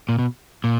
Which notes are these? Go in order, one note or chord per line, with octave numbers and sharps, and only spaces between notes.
A#2
B2
A#2